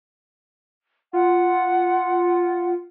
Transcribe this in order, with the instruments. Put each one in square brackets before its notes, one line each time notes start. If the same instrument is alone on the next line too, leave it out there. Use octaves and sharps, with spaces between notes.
[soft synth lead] F4 [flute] F#5